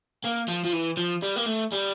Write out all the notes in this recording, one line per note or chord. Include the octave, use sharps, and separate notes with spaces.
A#3
F3
F3
E3
F3
G3
A#3
A3
G3